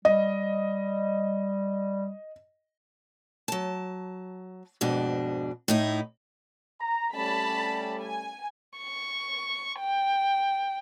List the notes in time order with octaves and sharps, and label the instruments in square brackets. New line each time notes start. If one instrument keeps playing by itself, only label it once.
[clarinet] G3 [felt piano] D#5
[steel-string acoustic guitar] F#3 A5
F2 G#2 B2 D4
A2 D#4 E4
[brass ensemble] A#5
[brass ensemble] G3 A3 C#4 [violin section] A5 B5
[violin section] G#5
[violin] C#6
G5